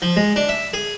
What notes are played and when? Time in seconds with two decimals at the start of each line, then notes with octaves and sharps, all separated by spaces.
0.02 F3
0.16 G#3
0.36 D4
0.49 E5
0.73 G#4